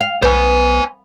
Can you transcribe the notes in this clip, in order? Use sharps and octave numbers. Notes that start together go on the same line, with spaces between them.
F5
B1 B3 C5 G#5